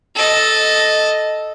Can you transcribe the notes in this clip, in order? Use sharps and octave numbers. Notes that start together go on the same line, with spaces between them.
A4 D#5